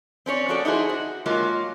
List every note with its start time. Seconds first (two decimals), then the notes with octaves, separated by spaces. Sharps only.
0.26 C4 C#4 C#5 D5
0.48 F3 A#3 F#4 G#4 A4 D5
0.65 D#4 E4 F#4 G#4 C5
0.89 F#4
1.26 F#3 G#3 A#3 F4